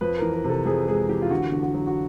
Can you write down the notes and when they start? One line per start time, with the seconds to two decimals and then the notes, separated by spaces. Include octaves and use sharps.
0.01 F2 B4
0.18 E3 A#4
0.33 A#4
0.44 C3
0.49 A4
0.66 F2 G#4
0.88 G#3 G#4
1.09 E3 G4
1.22 F4
1.30 D3 F#4
1.52 D3
1.63 F#4
1.74 F#3
1.87 F#4